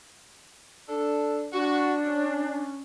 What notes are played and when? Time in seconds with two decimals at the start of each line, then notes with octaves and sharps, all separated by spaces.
0.89 D4 A4
1.53 D4 F#4
2.05 C#4